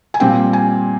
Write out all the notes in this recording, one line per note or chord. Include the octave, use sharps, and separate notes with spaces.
G#5
A#2 G3 C4 G5
G#5